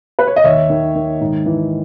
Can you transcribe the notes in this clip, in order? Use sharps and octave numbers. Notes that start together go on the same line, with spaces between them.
B4
C#5
D#5
D#2 C#5 E5
D#3
D#3
G#2
E3